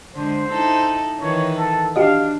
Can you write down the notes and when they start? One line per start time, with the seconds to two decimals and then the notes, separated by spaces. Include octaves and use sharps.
0.14 D3 G#3 C5
0.48 D#4 E4 A4
1.20 D#3 E3 C#5
1.56 A4
1.96 D4 F#4 G4 D#5 F5